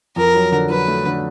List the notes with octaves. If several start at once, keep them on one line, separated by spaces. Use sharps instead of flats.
F2 A#4
F#3
D3
F#3 B4
A3
D3